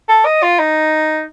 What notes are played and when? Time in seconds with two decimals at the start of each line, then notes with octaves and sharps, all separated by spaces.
0.09 A4
0.25 D#5
0.43 F4
0.59 D#4